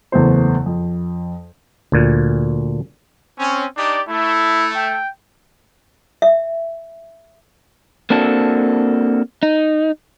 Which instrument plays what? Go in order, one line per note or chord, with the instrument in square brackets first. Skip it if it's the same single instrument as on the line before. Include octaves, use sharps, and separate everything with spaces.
[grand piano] F#1 E2 A3 B3 C5
F2
[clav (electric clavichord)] D2 A#2
[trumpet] C4 [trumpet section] C#4
[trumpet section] D4 D#4 G4 [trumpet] D5
[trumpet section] A3 [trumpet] E4
[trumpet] G5
[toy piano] E5
[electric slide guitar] A#3 C4 D4 F#4 A4
D#4